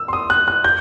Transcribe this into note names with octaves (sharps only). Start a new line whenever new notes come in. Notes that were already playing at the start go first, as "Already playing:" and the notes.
Already playing: E6
C6
D#6
F#6
F#6
G6